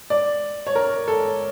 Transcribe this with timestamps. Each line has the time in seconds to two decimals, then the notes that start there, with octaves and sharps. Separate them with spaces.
0.10 D5
0.67 C#5
0.75 A#4
1.08 A4